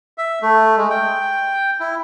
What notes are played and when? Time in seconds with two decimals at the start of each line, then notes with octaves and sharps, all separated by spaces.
0.18 E5
0.42 A3
0.77 G#3
0.90 G5
1.80 E4